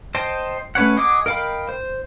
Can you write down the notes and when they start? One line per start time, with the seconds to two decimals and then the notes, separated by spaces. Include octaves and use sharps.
0.15 C5 D#5 G5 A5
0.75 A3 C#4 B4 C#5 F#5
0.97 G#4 D#5 F#5 D6 D#6
1.26 A#4 D#5 F5 G5 B5
1.69 C5